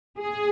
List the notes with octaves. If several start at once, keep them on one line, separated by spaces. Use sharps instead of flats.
G#4